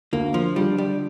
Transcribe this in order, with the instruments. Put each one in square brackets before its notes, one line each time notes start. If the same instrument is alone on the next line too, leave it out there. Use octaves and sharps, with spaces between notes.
[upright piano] D2 [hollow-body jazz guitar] A#3
[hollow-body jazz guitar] F3
[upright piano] D3 F3 [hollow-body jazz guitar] G3
[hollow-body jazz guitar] G3